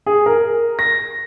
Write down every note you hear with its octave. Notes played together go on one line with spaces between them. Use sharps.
G#4
A#4
A#6